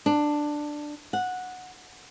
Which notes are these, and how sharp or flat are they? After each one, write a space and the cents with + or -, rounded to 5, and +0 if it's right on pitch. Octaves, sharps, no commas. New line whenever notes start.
D4 +10
F#5 -10